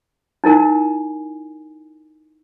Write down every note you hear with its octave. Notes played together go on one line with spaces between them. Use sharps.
D#4 E4 A#4 G#5